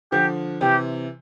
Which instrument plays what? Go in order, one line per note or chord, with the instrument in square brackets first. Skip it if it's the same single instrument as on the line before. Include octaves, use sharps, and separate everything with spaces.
[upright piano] D3 F3 [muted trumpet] G4
[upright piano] C3 E3 [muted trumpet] G4